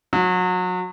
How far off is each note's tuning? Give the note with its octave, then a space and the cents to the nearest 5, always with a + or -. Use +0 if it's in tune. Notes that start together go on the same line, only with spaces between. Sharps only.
F#3 -30